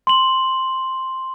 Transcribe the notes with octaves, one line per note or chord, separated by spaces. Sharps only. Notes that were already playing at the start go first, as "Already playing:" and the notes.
C6 F#7